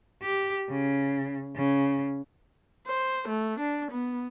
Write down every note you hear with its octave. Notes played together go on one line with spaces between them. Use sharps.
G4
C#3
C#3
C5
A3
D4
B3